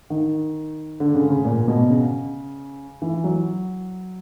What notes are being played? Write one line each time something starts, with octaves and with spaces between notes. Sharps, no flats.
D#3
D3
C#3
C#3
A#2
B2
C#3
E3
F#3